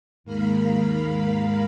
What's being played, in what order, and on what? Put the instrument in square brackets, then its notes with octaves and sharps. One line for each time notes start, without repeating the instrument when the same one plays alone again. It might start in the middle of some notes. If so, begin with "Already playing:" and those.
[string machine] D#2 G#2 A#4 F5 B5